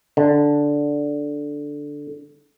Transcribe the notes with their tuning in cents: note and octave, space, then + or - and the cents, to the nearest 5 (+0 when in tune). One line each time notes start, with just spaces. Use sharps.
D3 -5